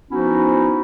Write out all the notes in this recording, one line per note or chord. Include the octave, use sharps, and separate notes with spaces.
F3 B3 C#4 D#4 E4 F#4